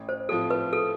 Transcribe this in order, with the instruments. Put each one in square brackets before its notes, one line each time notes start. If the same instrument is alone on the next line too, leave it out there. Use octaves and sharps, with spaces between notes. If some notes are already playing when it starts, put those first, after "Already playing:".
Already playing: [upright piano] A1
[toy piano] C5
[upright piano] A2 F3 C4 F4 [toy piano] A4
[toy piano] B4
A4